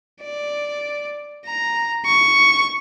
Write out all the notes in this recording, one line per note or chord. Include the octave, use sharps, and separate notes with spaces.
D5
A#5
C#6